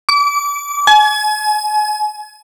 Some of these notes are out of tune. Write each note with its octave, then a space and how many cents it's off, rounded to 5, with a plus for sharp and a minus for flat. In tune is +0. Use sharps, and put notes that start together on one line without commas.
D6 -30
G#5 +35